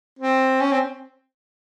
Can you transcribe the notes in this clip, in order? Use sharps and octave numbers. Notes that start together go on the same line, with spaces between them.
C4
C#4
C4